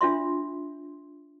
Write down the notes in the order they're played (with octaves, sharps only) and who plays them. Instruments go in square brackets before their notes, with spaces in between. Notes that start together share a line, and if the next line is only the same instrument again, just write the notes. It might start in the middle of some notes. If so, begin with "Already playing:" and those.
[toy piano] D4 F4 E5 C6